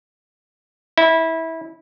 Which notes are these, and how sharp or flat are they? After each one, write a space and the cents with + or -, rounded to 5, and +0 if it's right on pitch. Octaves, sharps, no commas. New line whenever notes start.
E4 -20